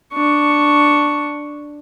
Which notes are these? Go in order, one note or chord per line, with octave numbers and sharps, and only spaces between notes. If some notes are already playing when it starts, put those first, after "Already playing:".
D4 C#6